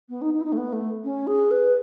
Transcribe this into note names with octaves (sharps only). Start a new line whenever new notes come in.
B3
D#4
D#4
E4
D#4
A3
B3
A3
C#4
G#4
B4